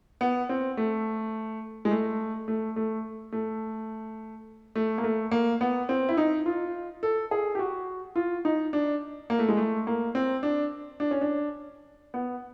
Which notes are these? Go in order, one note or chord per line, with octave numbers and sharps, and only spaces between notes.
B3
C4
A3
G#3
A3
A3
A3
A3
A3
A#3
A3
A#3
B3
C4
E4
D#4
F4
A4
G#4
G4
F#4
F4
D#4
D4
A#3
A3
G#3
A3
A#3
C4
D4
D4
C#4
D4
B3